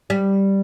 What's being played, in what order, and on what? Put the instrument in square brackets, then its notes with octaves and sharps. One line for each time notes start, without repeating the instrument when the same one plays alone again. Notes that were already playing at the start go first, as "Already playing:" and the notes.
[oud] G3